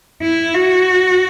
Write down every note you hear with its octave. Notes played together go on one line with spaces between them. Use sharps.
E4
F#4